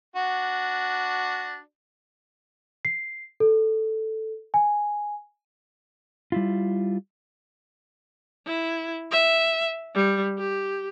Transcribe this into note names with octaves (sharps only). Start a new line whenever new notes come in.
D4 F#4
C7
A4
G#5
G3 E4 F4
E4
E5
G3
G4